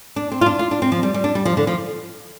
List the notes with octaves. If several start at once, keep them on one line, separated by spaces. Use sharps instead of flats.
D4
C4
F4
D4
F4
D4
C4
F3
G3
G3
D4
G3
F3
D3
F3